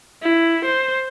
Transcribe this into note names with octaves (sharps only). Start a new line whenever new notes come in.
E4
C5